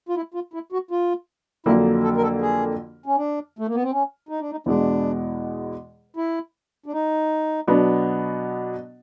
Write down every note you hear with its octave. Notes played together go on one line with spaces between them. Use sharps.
F4
E4
F4
E4
F#4
F4
F2 D3 F#3 A#3 E4
A4
A#4
A4
G#4
C#4
D4
A3
A#3
B3
C4
C#4
D#4
D4
D#4
E2 B2 G#3 D4
E4
D4
D#4
B2 F#3 B3 D4